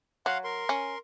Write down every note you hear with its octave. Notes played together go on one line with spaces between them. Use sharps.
F#3 F5 F#5 C6
A#4 C6
C#4